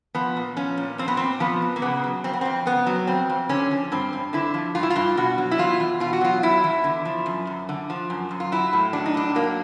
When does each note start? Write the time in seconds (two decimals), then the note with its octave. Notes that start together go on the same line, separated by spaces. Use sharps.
0.15 F3 B3
0.37 A#2
0.57 F3 C#4
0.77 A#2
0.98 F3 C4
1.08 B3
1.17 A#2 C4
1.40 F3 B3
1.62 A#2
1.76 A#3
1.82 C#3 B3
2.04 F#3
2.24 F2 C4
2.33 B3
2.41 F2 C4
2.66 C#3 B3
2.86 F#3
3.07 F2 C4
3.29 F2
3.49 D3 C#4
3.71 F3
3.92 G2 C4
4.13 G2
4.33 D3 E4
4.54 F3
4.75 G2 F4
4.83 E4
4.90 F4
4.96 G2
5.17 B2 F#4
5.38 F#3
5.51 E4
5.58 E2 F4
5.80 E2
6.00 B2 F4
6.13 F#4
6.21 F#3 F4
6.43 E2 E4
6.64 E2
6.84 D3
7.05 F3
7.26 F#2
7.47 F#2
7.69 D3
7.90 F3
8.10 F#2
8.31 F#2
8.40 F4
8.52 F#3 E4
8.73 A2
8.93 F#3 D4
9.06 D#4
9.14 A2 D4
9.35 F#3 A#3